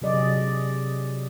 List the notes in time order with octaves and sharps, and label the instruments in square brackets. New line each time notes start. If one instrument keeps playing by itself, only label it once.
[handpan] C3 F#3 G#4 D5 D#5